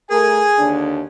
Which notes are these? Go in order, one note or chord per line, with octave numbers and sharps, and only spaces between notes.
A3 G#4 A#4 G#5
D#2 D3 D4